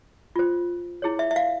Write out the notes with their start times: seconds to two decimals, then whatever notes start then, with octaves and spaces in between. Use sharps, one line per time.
0.36 F4 C5
1.02 E4 G#4 C#5
1.19 E5
1.31 E5
1.36 F5